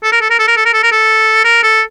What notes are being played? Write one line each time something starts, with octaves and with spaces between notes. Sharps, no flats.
A4
A#4
A4
A#4
A4
A#4
A4
A#4
A4
A#4
A4
A#4
A4